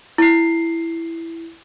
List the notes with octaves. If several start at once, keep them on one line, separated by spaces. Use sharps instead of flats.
E4 C7